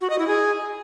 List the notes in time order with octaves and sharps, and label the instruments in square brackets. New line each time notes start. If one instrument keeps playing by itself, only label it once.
[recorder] F#4
D#5
E4
G#4